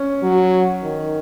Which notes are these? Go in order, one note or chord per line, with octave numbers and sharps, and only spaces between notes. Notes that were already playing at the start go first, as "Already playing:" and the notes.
Already playing: C#4
F#3
D#3